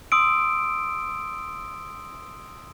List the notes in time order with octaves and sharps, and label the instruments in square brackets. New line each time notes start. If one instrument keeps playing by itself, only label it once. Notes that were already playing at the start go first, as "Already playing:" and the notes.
[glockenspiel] C6 D#6 E6 D7